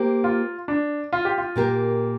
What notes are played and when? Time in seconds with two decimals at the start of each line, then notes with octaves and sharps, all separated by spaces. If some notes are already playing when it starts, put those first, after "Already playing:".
Already playing: A#3 G4 C5
0.24 F4
0.68 D4
1.13 F4
1.25 G4
1.38 F4
1.56 A#2 A#3 G4 A#4